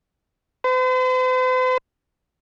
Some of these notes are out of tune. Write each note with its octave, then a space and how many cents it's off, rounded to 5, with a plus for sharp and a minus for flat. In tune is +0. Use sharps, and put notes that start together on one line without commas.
C5 -45